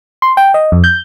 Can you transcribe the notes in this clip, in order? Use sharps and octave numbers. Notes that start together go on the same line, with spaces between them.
C6
G5
D#5
F2
G6